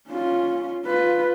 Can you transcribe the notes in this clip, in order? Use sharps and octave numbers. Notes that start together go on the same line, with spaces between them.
C#4 F4
F4 B4